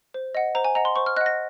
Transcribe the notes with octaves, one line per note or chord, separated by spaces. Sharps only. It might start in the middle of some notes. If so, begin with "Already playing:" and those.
C5
D#5 F#5
C5 A#5
G#5
D#5 F#5 A#5
C6
C5 C#6
F6
D#5 F#5 F#6
A#6